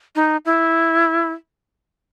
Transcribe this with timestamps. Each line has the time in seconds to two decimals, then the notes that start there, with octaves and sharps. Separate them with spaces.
0.16 D#4
0.45 E4